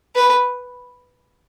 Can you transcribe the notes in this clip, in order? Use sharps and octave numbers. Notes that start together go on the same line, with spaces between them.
B4